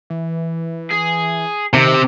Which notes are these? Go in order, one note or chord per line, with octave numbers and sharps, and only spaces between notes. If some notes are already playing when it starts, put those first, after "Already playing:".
E3
G#4
C3 D#3